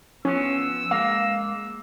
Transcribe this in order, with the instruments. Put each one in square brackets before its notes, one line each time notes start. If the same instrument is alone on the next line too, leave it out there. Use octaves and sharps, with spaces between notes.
[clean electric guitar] F3 B3 [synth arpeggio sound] C#4 [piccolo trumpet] E6
[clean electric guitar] G#3 A#3 [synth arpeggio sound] F5